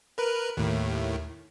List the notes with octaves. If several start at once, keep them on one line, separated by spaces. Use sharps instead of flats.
A#4 B4
D#2 A2